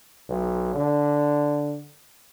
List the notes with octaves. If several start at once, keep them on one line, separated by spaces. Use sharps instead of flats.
B1
D3